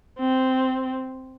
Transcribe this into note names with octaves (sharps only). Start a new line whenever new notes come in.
C4